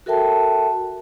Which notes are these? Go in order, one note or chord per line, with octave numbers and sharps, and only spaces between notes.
F#4 A4 A#4 E5 G5 A5